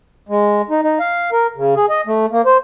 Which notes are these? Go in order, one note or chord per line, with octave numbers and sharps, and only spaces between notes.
G#3
D#4
D#4
F5
A#4
C#3
G#4
D#5
A3
A#3
C5